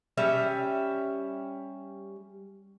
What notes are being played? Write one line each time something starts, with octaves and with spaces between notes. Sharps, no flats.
G3 C#4 E5